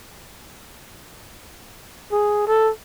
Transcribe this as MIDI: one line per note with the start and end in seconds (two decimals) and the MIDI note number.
2.12 2.45 68
2.48 2.70 69